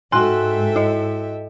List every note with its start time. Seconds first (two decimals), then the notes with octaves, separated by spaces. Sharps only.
0.12 G#2 F#4 A4 E5 G5 G#5 C6 F#6
0.76 E4 D#5